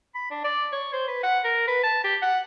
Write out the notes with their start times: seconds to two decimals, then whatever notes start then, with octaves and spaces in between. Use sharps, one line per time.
0.15 B5
0.31 D4
0.44 D5
0.73 C#5
0.93 C5
1.08 B4
1.23 F#5
1.45 A#4
1.68 B4
1.84 A5
2.04 G4
2.22 F#5